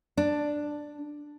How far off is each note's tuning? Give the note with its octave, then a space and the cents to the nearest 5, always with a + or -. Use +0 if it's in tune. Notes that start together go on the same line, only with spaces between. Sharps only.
D4 +5